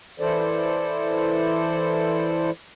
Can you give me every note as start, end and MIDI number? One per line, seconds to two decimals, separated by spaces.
0.20 2.51 52
0.20 2.51 64
0.20 2.51 69
0.20 2.51 72
0.20 2.51 74